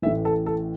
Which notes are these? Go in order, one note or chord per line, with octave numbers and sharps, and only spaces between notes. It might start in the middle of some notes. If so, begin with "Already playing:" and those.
A1 A2 E3 E5
A4
A4